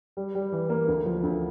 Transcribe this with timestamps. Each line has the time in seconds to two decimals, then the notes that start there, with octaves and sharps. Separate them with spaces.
0.17 G3
0.35 G3
0.52 E3
0.70 A#3
0.88 D2
1.06 F3
1.24 D2